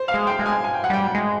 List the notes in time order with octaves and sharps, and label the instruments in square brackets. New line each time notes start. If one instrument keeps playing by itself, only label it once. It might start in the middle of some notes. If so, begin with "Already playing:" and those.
Already playing: [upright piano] C5
F5
[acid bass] G#3
[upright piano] G5
[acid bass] G#3
[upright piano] G#5
G#5
G5
F#5
[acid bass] G3 [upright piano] G5
[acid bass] G#3